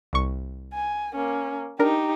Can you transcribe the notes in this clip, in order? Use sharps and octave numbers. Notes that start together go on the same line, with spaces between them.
C2 C#6
G#5
A#3 C#4
D4 D#4 G4 A#4